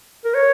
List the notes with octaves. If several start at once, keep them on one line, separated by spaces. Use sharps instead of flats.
A#4
C#5